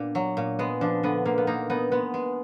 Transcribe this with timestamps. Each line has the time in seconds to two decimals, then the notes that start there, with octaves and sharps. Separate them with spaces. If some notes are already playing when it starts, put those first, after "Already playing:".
Already playing: A#2 B3 D4
0.15 F#3
0.37 A#2
0.59 G#3 B3
0.81 F3 D4
1.03 D3 B3
1.25 D3 A#3
1.38 B3
1.47 A#3 D#4
1.70 B3 D#4
1.92 G#3 B3
2.14 G#3